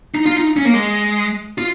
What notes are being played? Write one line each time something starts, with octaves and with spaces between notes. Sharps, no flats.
D#4
F4
D#4
C#4
A#3
G#3
F4